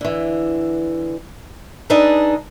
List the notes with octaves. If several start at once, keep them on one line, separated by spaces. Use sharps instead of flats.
D3 E3
D4 D#4 G#4 A4 B4